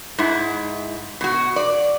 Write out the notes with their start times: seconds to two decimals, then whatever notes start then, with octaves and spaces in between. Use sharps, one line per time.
0.18 G#2 E4
1.21 B2 F#4
1.56 D5